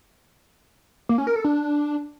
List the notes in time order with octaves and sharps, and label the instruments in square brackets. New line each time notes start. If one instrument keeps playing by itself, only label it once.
[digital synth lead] A#3
C#4
A#4
A4
D4